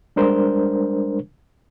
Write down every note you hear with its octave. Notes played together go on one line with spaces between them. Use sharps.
G3 G#3 D4 A#4 C5